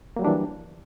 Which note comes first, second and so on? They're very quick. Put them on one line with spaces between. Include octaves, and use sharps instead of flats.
A#3 F#3 G3 D4 E3